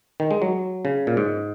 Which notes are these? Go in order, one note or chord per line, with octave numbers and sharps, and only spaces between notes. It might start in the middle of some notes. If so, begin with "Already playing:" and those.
D#3
G#3
F#3
C#3
A#2
G#2